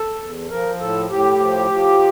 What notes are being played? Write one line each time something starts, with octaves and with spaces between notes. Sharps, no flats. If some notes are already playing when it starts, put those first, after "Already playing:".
Already playing: A4
E2
F3 A#4
A2 A4
A2 G4
F3
F3